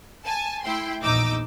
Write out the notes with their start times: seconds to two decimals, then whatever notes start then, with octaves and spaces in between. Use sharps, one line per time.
0.25 G#5 A5
0.64 A3 E4 G5 C6
1.03 A#1 E2 D#4 D6 E6